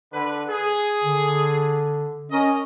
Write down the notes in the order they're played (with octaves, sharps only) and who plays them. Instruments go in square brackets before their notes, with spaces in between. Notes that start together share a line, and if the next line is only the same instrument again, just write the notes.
[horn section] D3 B4
G#4
[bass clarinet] D3
[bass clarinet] C#4 [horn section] A#4 D#5